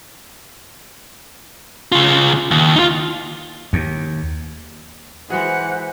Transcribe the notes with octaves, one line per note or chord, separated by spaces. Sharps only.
C#3 F4
D#2
D#4 F4
D#2
E3 G#3 F#4 G#4 C5 F#5